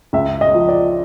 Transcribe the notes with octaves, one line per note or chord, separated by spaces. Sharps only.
C#2 E5
D#5
F3
D5